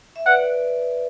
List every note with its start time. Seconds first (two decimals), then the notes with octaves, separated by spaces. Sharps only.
0.16 E5
0.26 B4 D5 F#5